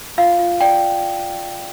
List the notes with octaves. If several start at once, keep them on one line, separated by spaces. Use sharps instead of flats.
F4 F5
F4
D5 G5